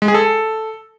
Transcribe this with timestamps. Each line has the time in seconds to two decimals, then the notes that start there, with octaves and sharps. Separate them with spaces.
0.02 G#3
0.08 G#4
0.14 A4